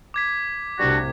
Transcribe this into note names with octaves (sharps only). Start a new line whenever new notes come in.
D6 G#6 B6
C2 A2 C3 G3 D4 F#4